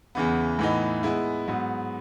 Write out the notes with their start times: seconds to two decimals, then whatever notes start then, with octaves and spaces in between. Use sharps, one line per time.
0.15 E2 C#3 E3 B3
0.59 A2 E3 B3 D#4
1.03 G#3 B3 E4
1.48 G#2 F#3 B3